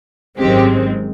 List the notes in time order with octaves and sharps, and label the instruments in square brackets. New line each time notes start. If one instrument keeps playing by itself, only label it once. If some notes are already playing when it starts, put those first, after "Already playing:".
[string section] G#1 F#2 D#3 G#3 C4 G4